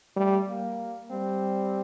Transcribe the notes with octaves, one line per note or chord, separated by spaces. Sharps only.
G3 A3
A#3
G3 C4